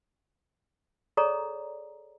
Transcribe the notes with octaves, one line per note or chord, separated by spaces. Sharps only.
G#4 A4 C#5 D5 A#5